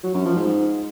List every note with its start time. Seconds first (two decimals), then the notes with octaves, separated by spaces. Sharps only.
0.04 F#3
0.14 F#2
0.25 F3
0.36 G#2